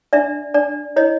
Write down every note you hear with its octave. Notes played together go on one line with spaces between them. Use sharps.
D4 D5 E5
D4 D5
E4 C#5 D#5